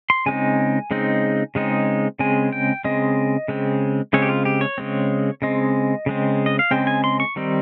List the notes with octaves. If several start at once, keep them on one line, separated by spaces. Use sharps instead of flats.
C6
C#3 G#3 C4 D#4 G#5
C#3 G#3 C4 D#4
C#3 G#3 C4 D#4
C#3 G#3 C4 G#5
G5
C#3 G#3 C4 D#5
C#3 G#3 C4
C#3 G#3 C4 C#5
G4
F4
G4
C#5
C#3 G#3 C4
C#3 G#3 C4 D#5
C#3 G#3 C4
D#5
F5
C#3 G#3 C4 G5
G#5
C6
C#6
D#3 G3 C4 D#4